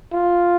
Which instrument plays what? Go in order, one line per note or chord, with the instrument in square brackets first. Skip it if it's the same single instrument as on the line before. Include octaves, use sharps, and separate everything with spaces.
[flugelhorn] F4